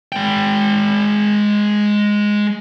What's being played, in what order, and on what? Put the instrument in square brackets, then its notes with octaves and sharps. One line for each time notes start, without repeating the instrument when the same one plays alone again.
[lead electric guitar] G#3 G5